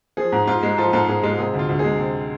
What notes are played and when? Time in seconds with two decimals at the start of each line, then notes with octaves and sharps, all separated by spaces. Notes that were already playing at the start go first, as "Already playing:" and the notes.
0.17 F3 G#4
0.32 G#2
0.47 G#2 F4
0.63 G#3
0.77 F3 F4 A4
0.93 G#2 F4 A4
1.08 G#2 G#4
1.23 G#3 F4
1.38 C3 G#4
1.54 D2
1.59 F4
1.69 D2
1.79 G#4
1.84 G#3
1.99 C3